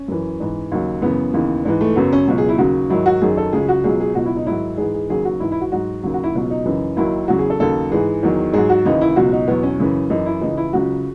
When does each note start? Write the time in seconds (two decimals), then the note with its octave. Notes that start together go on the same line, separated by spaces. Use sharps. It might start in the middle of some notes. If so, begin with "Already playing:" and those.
Already playing: C#4
0.08 F#2 E3
0.40 G#2 E3
0.72 D#2 C#3 F#3
1.02 F#2 C#3 E3 B3
1.33 D#2 C#3 E3
1.65 G#2 E3
1.81 A3
1.96 F#2 C#3 F#3 B3
2.13 C#4
2.27 C#2 B2 F#3
2.38 G#4
2.49 E4
2.58 D#2 C#3 F#3 F#4
2.90 G#2 D#3 F#3 E4
3.06 F#4
3.22 F#2 D#3 F#3 G#4
3.37 A4
3.53 C#2 C#3 F#3 G#4
3.69 F#4
3.84 C#2 B2 F#3 G#4
4.00 G#4
4.15 C#2 B2 F#3 F#4
4.26 E4
4.37 D#4
4.46 G#2 D#3 F#3 E4
4.77 G#2 E3 G#4
4.94 G#4
5.10 D#2 C#3 F#3 G#4
5.25 F#4
5.40 G#2 E3 E4
5.52 E4
5.61 F#4
5.72 G#2 F#3 F#4
6.03 D#2 C#3 F#3
6.14 F#4
6.24 E4
6.35 C#2 B2 F#3
6.50 D#4
6.65 F#2 C#3 E3
6.97 D#2 D#3 F#3 E4
7.28 E2 C#3 F#3 F#4
7.39 G#4
7.50 A4
7.60 D#2 C#3 F#3 A4
7.91 G#2 E3 G#4
8.23 E2 D#3 F#3
8.53 G#2 F#3 G#4
8.69 F#4
8.85 D#2 C#3 E3 D#4
9.01 E4
9.16 C#2 B2 F#3 F#4
9.32 D#4
9.48 E2 B2 F#3 B3
9.63 C#4
9.79 F#2 C#3 E3
10.10 F#2 E3 D#4
10.26 E4
10.41 C#2 C#3 E3 D#4
10.57 E4
10.73 C#2 C#3 F#3 F#4